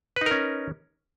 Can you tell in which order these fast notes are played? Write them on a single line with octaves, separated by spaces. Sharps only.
B4 D#4 A#4 C#4